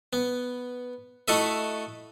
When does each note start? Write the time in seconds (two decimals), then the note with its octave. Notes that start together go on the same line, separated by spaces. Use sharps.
0.13 B3
1.28 A3 E4 F#4 A4 D#5 E5